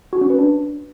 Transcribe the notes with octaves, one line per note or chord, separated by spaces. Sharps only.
F#4
C#4
B4
D4